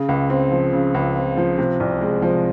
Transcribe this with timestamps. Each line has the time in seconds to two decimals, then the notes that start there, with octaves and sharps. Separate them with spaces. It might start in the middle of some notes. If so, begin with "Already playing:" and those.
Already playing: C#3
0.09 C#2
0.30 C4
0.52 F3
0.73 C#3
0.94 C#2
1.16 C4
1.37 F3
1.58 C3
1.80 C2
2.01 G#3
2.22 F3